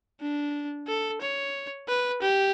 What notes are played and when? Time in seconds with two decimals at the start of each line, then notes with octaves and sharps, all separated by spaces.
0.20 D4
0.88 A4
1.21 C#5
1.88 B4
2.22 G4